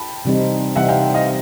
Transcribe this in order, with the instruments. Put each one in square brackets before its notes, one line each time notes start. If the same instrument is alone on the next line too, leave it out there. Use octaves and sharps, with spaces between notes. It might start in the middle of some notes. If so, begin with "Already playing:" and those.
Already playing: [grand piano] G5 A5 B5
[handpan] C3 E3 G3 C4 D#4
[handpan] C3 E3 G3 C4 D#4 [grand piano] E5 F#5
[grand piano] F5 G5
D#5 F5